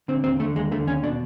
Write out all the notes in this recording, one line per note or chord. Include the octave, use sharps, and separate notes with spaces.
D3 C4
D#2 C4
D3 A3
D#2 G#3
D3 A3
D#2 C#4
B2 D4